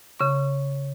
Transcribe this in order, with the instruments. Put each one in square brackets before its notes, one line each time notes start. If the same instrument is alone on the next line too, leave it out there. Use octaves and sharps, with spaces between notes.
[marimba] C#3 C#6